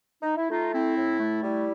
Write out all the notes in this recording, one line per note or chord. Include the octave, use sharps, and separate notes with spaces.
D#4
E4
A3 D#4 F4
C4 E4
A2
A3
G3 E4